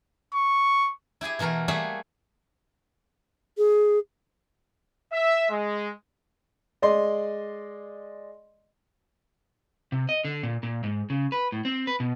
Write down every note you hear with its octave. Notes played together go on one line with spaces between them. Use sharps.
C#6
E4 G4 G#4 G#5
B2 E3 A3 A#4 F5
G3 A3 A#3 G#4 E5 F#5
G#4
E5
G#3
G#3 D5 D#5 C6
C3
D#5
D3
A#2
A#2
G#2
C#3
B4
A2
C4
B4
B2